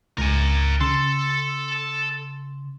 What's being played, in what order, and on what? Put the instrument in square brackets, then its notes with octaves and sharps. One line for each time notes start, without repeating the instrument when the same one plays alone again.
[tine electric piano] C#2 [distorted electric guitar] A#4 G#5
[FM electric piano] C#3 [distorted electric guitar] A4 [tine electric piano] C6